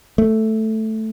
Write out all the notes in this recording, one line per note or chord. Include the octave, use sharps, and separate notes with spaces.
A3